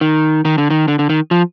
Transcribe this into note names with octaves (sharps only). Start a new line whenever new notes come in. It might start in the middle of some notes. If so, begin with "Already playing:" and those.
D#3
D#3
D3
D#3
D3
D3
D#3
F3